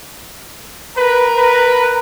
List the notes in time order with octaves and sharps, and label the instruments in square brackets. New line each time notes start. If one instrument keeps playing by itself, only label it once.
[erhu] A#4 [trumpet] B4
[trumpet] B4